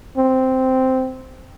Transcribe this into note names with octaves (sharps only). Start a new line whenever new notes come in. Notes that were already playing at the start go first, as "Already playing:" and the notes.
C4